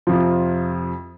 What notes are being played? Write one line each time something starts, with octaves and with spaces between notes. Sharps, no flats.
F2 C3 F3 F4